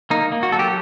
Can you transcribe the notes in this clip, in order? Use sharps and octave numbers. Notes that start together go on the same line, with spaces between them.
A#3 D#4
A#3
F#4
F#3 A4
G4